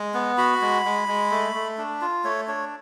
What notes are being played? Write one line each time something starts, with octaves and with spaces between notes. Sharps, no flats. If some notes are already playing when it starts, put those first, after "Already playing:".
Already playing: G#3
B3
F#4 B5
G#3
G#3
G#3
A3
A3
D4
F4
A3 C#5
D4 C#5